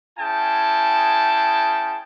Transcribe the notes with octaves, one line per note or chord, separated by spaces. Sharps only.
C#4 E4 G#4 G5 A5